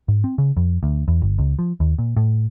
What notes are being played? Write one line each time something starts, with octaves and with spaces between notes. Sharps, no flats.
G#2
C4
C#3
F2
D2
E2
G1
C#2
F3
D#2
A#2
A2